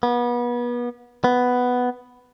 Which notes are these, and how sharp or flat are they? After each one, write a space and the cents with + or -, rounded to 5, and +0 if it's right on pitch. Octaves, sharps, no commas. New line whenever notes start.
B3 -30
B3 +5